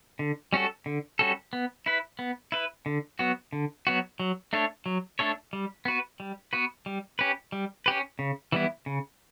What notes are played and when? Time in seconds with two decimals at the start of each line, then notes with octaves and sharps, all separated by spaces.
0.19 D3
0.53 G3 C#4 F#4 A4
0.86 D3
1.19 G3 C#4 F#4 A4
1.53 B3
1.86 E4 B4
2.19 B3
2.52 E4 B4
2.86 D3
3.19 F#3 B3 F#4
3.53 D3
3.87 F#3 B3 F#4
4.20 F#3
4.53 A3 D4 A4 C#5
4.86 F#3
5.19 A3 D4 A4 C#5
5.53 G3
5.85 B3 F#4 B4
6.20 G3
6.53 B3 F#4 B4
6.86 G3
7.19 C#4 G4 B4
7.52 G3
7.86 C#4 G4 B4
8.19 C#3
8.52 E3 G3 B3 E4
8.86 C#3